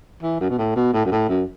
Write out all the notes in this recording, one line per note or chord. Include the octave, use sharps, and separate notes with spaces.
E3
F#2
B2
A2
B2
A2
F#2
A2
F#2